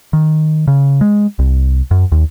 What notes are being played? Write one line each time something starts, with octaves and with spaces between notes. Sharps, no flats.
D#3
C#3
G#3
C2
F#2
D#2